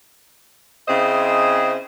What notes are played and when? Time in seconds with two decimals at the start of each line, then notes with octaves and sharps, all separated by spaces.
0.88 C#3 C4 E4 G#4 C5 D#5